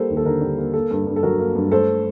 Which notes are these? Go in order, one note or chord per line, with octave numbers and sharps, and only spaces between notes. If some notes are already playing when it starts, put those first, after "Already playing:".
Already playing: G3 A#3 A4 C5
D#2
A4
D3 A#4
G3
A#3
A#3 A4
G2
G2
A4
F#3 A#4
A#3
G2
A3 A4 C5